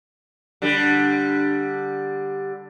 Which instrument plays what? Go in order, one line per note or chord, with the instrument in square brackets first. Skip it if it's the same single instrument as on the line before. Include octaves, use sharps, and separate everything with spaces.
[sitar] D3 G3